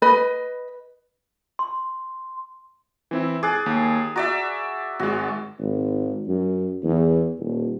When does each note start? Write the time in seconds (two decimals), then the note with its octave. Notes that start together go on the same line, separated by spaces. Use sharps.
0.02 B4 D#5 B5
1.59 C6
3.11 E3 C4 E4
3.43 G#4 D6 F#6 A6
3.66 D#2
4.16 F#4 D5 E5 A#5
4.99 G#1 G#3 F#4
5.59 G#1
6.27 F#2
6.83 E2
7.39 D#1